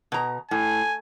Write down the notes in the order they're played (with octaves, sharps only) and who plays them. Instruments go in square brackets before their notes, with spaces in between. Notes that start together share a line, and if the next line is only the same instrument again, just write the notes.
[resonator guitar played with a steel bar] B2 A#5
[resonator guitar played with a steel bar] A2 [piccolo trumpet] G#5